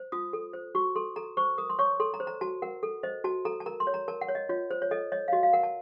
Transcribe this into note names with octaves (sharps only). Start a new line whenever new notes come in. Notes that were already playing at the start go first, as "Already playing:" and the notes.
Already playing: C5
F4 D#6
A4
C5
F#4 C#6
A4 C6
A4 A#5
C5 C#6
A#4 D#6
C6
C#5 C#6
A4 C6
A#5
C5
A#5
F#4 A5
A#4 F#5
A4
C5 D#5
F#4 A5
A4 A#5
A5
A#4 A#5
C6
C#5
A#5
A#4 A5
F#5
C#5
D#5
F4 C#5
C5
C#5
A4 D#5
C#5 D#5
F5
F#4 D#5
F5
A#4 F#5
A5